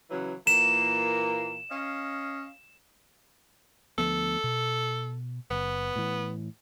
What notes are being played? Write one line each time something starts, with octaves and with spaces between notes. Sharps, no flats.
C#3 E3 F#3
A#2 E3 A#3 E7
C#4 D#5 F5
D2 F3 B3 A4
B2
F#1 B3
A2 E3